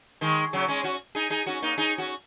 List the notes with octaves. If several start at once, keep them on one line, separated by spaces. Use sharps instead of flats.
D#3 G#3
C#3 F#3
G#3 C#4
C#4 F#4
D#4 G#4
D#4 G#4
C#4 F#4
A#3 D#4
D#4 G#4
C#4 F#4